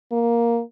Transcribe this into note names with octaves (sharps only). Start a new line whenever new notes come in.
A#3